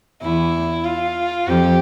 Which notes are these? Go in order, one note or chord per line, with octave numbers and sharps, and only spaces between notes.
E2 E4
F4
F2 G4